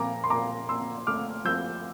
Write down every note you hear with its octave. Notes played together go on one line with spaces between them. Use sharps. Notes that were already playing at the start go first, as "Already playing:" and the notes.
Already playing: A#2 F3 A#5 D6
C6
A#2 A#5 D6
A#2 C6 E6
A3 D6 F6
F3 E6 G6